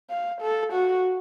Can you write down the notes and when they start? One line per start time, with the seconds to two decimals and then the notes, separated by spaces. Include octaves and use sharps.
0.10 F5
0.41 A4
0.73 F#4